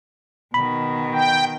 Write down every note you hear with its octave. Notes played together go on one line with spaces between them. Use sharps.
B2 D#3 B5
G5